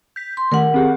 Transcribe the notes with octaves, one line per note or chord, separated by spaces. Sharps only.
G6 B6
C6
D#3 A3 A#4 F#5
C4 G4 G#4